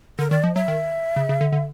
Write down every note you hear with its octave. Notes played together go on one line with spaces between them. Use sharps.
D3 A#4
D#3 D5
F3 D#5
F#3 E5
D#3
C#3
C#3
D3
D3